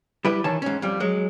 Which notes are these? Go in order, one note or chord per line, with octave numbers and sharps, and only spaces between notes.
G3 E4 B4
D#3 E3 C#5 A5
G#2 C#4
F2 G3
F#3 G#3